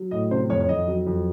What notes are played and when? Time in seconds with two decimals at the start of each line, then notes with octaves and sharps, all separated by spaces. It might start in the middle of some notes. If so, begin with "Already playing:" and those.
Already playing: F#3
0.11 A2 D#5
0.31 C3 C5
0.49 F2 C#5
0.61 C#5
0.69 F2 D#5
0.88 F#3
1.07 F2